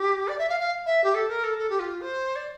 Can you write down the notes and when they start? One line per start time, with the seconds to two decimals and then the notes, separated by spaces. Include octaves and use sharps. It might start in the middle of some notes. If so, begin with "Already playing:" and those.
Already playing: G4
0.28 D5
0.39 E5
0.49 F5
0.60 F5
0.86 E5
1.04 G4
1.14 A4
1.29 A#4
1.44 A4
1.58 A4
1.70 G4
1.79 F4
2.01 C5
2.36 D5